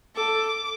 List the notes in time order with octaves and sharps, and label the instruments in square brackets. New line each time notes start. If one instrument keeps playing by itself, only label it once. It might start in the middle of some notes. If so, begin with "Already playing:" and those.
[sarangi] A4 [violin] D6